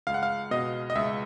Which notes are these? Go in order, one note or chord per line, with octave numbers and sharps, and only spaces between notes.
C#2 F5
F#5
F5
B2 D#5
D#5
C#2 E5